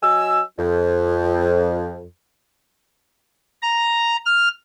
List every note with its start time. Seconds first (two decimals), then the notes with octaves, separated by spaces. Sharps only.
0.03 F#3 D#5 G#5 E6
0.58 F2
3.62 A#5
4.26 F6